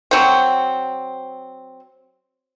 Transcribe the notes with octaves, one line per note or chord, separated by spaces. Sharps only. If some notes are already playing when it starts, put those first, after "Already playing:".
F#3 C4